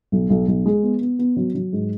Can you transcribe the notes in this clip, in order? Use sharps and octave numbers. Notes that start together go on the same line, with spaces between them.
B1
B1
B1
G#3
B3
B3
B3
F#3
F#3
G#2